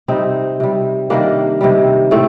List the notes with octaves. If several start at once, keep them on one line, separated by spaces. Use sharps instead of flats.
C3 G3 C4 D#4
C3 G3
C3 D#3 G3 A#3 D4
C3 D#3 G3
A2 A3 C4